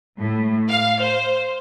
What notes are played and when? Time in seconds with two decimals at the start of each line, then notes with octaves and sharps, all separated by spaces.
0.20 A2
0.69 F5
1.01 C5